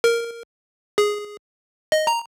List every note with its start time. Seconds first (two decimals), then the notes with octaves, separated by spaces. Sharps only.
0.04 A#4
0.98 G#4
1.92 D#5
2.07 A#5